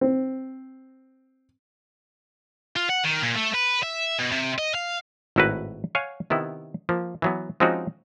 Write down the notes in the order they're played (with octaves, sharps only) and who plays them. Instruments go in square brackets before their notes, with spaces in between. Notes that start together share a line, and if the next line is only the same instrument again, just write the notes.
[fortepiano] C4
[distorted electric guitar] F4
F#5
D#3
A#2
A3
B4
E5
B2
C3
D#5
F5
[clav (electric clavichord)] G#1 A2 E4 F#4 A#4 B4
C#5 F5 F#5 G#5
C3 D#3 B3 E4
F3 A#3
E3 F#3 B3
F3 G#3 C4 C#4 D#4 F#4